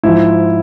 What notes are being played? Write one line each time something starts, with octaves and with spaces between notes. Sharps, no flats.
G#2 F3 E4